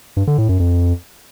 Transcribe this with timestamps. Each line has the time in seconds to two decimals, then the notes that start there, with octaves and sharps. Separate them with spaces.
0.17 G2
0.27 D3
0.38 A2
0.49 F#2
0.60 F2